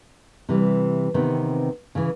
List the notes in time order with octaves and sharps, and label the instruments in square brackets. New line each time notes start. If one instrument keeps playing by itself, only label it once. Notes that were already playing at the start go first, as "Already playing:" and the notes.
[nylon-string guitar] C3 E3 G3
C3 D#3 B3 C4
C#3 E3